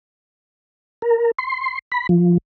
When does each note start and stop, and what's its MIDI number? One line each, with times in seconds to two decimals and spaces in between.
1.02 1.31 70
1.38 1.79 84
1.92 2.07 83
2.09 2.38 53